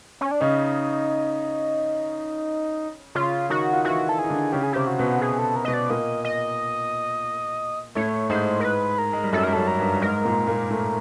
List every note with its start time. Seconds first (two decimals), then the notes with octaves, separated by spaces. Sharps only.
0.21 C#4
0.31 D4
0.41 C#3 C#4 D#4
3.15 C#3 C#4 F4
3.50 D#3 D#4 F#4
3.73 F4
3.85 E3 E4 F#4
4.09 A4
4.19 G#4
4.24 D#4
4.30 D3 D4
4.52 C#3 C#4 G4
4.63 G#4
4.73 C3 C4 G4
4.87 F#4
4.99 B2 B3
5.21 G#4
5.39 A4
5.56 A#4
5.65 B2 B3 D#5
5.74 D5
5.89 A#2 A#3 D#5
6.25 D#5
7.95 A2 A3 C#5
8.30 G#2 G#3 C5
8.60 A#4
8.65 B4
8.98 A#4
9.13 G#3
9.24 G3
9.33 F#2 F#3 A4
9.44 G3 A#4
9.53 F#2 F#3 A4
9.68 A#4
9.79 G2 G3
9.97 G3
10.02 G#2 G#3 A#4
10.24 A#2 A#3
10.47 A#2 A#3
10.71 A2 A3